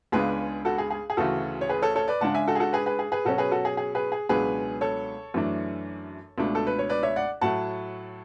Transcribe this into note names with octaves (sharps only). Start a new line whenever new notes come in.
C#2 C#3 G#3 B3 D4 G#4 B4
F#4 A4
G#4
G#4
G#4
D2 C#3 E3 A3 F#4 A4
C#5
G#4 B4
A4 C#5
A4 C#5
B4 D5
C#3 G#3 D4 F#5 A5
E5 G#5
F#4 A4
G#4
F#4 A4
G#4 B4
G#4 B4
G#4
G#4 B4
B2 F#3 C#4 F#4 A4
G#4 B4
F#4 A4
G#4
G#4
G#4 B4
G#4
C#2 B2 F#3 B3 D4 G#4 B4
A4 C#5
F#2 E3 A3 D4
C#2 B2 A3 D4
A4
B4
C#5
B4 D5
C#5 E5
D5 F#5
A2 F#3 A3 F#5 A5